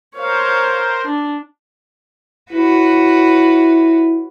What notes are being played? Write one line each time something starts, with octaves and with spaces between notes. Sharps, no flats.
A#4 C5 C#5 F5
D4
E4 F#4 B4 C#5